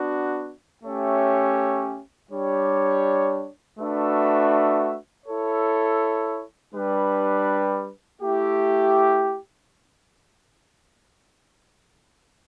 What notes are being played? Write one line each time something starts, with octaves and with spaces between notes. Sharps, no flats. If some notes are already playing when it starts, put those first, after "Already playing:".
Already playing: B3 D4 F#4
A3 C#4 G4 C#5 E5
G3 D4 G4 C#5
A3 D4 F#4 B4 E5
E4 A4 C#5
G3 D4 G4 B4
A3 E4 G4